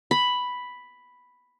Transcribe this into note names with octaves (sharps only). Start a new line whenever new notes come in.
B5